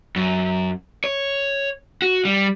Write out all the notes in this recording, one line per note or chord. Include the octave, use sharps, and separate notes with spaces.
F#2
C#5
F#4
G3